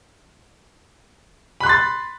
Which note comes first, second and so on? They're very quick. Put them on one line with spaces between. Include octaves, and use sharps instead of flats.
B5 F#6 C6 A6